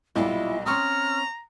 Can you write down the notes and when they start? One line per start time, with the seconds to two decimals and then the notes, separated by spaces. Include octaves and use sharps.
0.16 B1 A#2 G3 E4 F4 D#5
0.66 C4 C#4 A#5 C6 C#6 D#6 F6